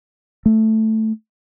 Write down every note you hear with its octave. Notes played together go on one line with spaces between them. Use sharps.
A3